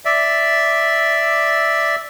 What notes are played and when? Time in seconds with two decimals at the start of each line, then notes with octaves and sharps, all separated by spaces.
0.05 D5 E5